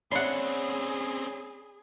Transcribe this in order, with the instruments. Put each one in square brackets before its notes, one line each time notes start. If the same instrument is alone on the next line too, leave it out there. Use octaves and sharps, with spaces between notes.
[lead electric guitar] C4 C#4 [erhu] G#4 [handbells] C#5 D5 B5 [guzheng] F#5 C6